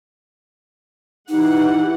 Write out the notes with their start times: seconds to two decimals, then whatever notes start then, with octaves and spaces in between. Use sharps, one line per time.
1.29 E3 D#4 G4 F#5